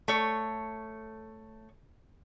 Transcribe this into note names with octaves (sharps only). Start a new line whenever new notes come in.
A3 C#5